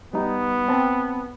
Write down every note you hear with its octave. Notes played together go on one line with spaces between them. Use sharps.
G3 B3 D#4
C4 A5